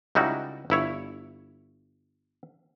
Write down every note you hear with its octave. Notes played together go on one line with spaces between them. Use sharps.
C#2 G3 D#4 E4 F#4
G1 E4 C#5